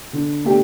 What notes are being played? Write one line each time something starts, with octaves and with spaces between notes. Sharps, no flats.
D3
A3 D4 G4